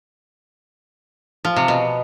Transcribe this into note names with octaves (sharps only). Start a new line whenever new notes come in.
F3
C3
B2